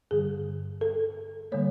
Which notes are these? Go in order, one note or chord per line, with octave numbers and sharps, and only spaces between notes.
G2 D3 G3 G#4
A4
D3 G3 A#3 C#5